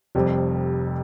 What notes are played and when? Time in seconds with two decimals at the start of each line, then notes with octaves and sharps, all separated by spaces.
0.15 F1 F2 C3 G3